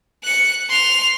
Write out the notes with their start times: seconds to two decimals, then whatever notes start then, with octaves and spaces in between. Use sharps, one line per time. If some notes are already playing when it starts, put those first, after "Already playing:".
0.24 F#6 C#7
0.69 C6 F7